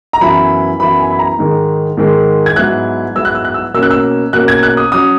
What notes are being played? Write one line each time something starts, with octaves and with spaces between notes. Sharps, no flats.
A#5
F#2 E3 B3 E4 B5
F#2 E3 B3 E4 B5
G#5
B5
A#5
G#2 D#3 G#3
G#2 D#3 G#3
G#6
G#2 F#3 B3 E4 F#6
G#2 F#3 B3 E4 E6
F#6
E6
F#6
E6
B2 A#3 C#4 E6
F#6
E6
B2 A#3 C#4 F#6
G#6
F#6
D#6
F#3 C#4 D#6